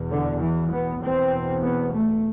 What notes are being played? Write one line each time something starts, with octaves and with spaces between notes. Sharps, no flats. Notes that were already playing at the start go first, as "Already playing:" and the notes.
Already playing: E2 B2
D3
E3
B3
E2 B2 C4
B3
A3